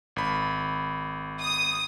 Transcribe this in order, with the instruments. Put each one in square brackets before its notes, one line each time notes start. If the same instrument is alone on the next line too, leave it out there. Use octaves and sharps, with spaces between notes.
[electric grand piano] G#1 B5
[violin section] D#6